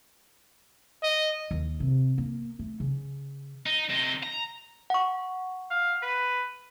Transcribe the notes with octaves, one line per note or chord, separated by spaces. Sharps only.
D#5
D#2
C3
A#3
A3
C#3
D#4
C3 D#4
A#5
F#5 C#6
F5
B4